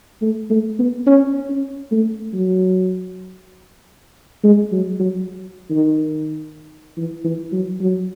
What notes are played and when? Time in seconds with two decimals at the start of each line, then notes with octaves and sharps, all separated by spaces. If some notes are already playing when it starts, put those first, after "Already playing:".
0.22 A3
0.50 A3
0.79 B3
1.07 C#4
1.49 C#4
1.92 A3
2.34 F#3
4.44 G#3
4.72 F#3
4.99 F#3
5.70 D#3
6.97 E3
7.24 E3
7.52 F#3
7.81 F#3